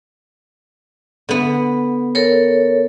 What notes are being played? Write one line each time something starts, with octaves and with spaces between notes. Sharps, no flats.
D3 B3
A4 A#4 C#5